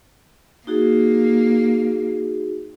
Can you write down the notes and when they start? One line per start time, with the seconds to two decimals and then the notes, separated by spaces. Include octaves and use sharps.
0.67 A#3 D#4 F#4 G#4